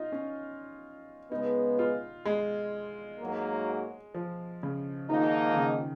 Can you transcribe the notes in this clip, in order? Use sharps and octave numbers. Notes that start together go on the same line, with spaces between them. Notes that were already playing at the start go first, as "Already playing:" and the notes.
Already playing: D#4 F4
C#4
C#3 G#3 B3 D#4
F4
G#3
G#2 F#3 A#3
F3
C#3
G#2 D#3 F3 A#3 D#4
D#3
C#3